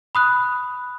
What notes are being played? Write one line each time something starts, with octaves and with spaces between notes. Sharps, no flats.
B5 D#6 F#6